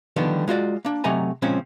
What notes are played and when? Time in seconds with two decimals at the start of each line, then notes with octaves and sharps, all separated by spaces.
0.16 D3 D#3 F3 G3 B3
0.48 G#3 F4 F#4 D5
0.85 A#3 D4
1.04 C3 F#3 A3 D#5 G#5 A#5
1.42 A#2 C#3 F3 G#3 C4 C#4